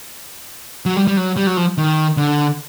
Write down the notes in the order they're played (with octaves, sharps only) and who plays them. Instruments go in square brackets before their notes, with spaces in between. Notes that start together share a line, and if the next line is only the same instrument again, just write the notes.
[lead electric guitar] F#3
G3
G3
F#3
G3
F#3
F3
D#3
D3